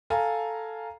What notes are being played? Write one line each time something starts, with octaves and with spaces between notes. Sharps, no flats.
A4 F5 G#5 A#5